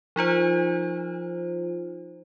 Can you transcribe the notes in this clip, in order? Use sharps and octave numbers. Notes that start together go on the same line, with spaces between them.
F3 D#4 F4 C5